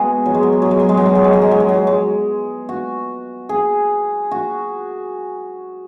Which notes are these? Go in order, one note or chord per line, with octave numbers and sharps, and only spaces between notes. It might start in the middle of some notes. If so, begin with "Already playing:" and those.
Already playing: G#3 B3 F#4 G#4
F#3
G#3
F#3
G#3
F#3
G#3
F#3
G#3
F#3
G#3
F#3
G#3
F#3
G#3
F#3
G#3
F#3
G#3
F#4
G#4
F#4